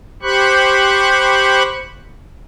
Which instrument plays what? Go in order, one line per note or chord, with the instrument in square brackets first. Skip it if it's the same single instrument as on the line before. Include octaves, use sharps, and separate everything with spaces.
[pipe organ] G4 C5 B5 C#6 F#6